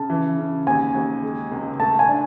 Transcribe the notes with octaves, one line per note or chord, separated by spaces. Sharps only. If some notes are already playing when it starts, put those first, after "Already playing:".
Already playing: C#3 A5
E3
C#3
D#2 G#5
D#2
G#3
C#2
A3 A5
G#5
D4